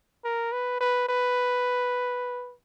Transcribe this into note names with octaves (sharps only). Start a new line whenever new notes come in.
A#4
B4
B4
B4